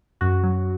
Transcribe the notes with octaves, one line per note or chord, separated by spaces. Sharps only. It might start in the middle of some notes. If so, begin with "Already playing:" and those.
F#2 F#4
F#3